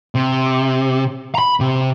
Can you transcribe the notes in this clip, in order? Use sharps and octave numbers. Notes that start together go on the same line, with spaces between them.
C3
A#5 B5
C3